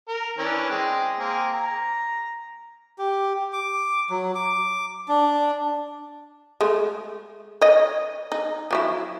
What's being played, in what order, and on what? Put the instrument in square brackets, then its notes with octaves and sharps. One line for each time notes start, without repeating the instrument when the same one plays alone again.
[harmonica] A#4
E3 C#4 D4
G#3 C4
A#3 C4 G#4
A#5
[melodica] G4
D6
F#3
D6
D4
[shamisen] G#3 A3
C#5 D#5
D#4
F3 F#3 E4